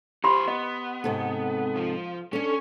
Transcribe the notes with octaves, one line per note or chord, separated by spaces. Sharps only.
E3 G4 C5 B5 C6
B3 D#5
G#2 C3 A4
F3
C#4 D4 A4